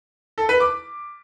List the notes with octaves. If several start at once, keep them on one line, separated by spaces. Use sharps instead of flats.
A4
B4
D6